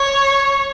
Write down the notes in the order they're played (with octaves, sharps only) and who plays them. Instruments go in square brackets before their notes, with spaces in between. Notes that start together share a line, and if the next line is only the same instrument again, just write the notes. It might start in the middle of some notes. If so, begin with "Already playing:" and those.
Already playing: [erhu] C#5